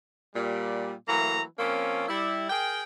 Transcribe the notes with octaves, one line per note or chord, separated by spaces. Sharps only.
A#2 G3
E3 F#3 A3 A#3 A#5
F3 A#3 C4 C#4
G3 E4
G#4 A#4 G5